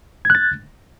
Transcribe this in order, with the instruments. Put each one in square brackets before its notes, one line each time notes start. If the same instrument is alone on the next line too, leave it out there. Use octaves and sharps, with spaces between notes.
[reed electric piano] G#6
F#6
A6